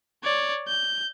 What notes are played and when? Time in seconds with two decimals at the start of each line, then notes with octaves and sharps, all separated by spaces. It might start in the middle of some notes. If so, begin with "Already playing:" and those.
0.24 C#5 D5
0.68 G6